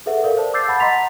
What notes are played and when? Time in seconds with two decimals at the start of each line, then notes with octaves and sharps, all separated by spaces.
0.06 G#4 A4 B4 E5 F#5
0.23 A4 A#4 D5 F5
0.37 C5 A5
0.54 D6 E6 G6 A6 C7
0.67 F#5 A5 B5 A6
0.80 D#5 F#5 A#5 C6 B6 F7